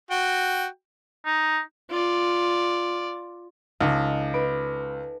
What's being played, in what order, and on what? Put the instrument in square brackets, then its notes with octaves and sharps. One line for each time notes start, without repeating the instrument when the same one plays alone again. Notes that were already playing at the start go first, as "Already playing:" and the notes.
[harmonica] F#4 G5
[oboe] D#4
[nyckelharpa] F4 D5
[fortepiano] C#2 [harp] D#4 A4 D#7
[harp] B4 D7